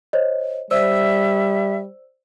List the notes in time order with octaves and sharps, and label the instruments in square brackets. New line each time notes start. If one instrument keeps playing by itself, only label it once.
[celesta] C5 C#5 D#5
[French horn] G3 [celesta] C5 D5 E6 [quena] E5